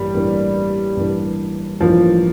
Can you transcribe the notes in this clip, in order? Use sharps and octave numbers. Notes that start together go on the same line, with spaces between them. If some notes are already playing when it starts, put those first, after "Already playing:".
Already playing: A1 G2 E3 G3 A#3
A1 G2 E3 A#3
A1 G2 E3 A#3
A1 G2 E3 F3 A#3